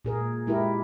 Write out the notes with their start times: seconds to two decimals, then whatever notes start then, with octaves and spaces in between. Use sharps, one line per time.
0.05 A#2 G#4 A#4
0.47 G#3 E4 G4 A#4